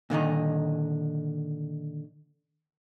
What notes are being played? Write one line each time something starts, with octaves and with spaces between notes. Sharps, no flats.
A#2 D3 D#3 D#4